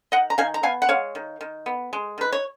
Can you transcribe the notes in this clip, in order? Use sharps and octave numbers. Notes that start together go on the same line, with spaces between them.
D#3 D#5 F#5
A#5
D#3 F5 G#5
A#5
B3 F5 G#5
F#5
G#3 C#5 F5
D#3
D#3
B3
G#3
D#3 B4
C#5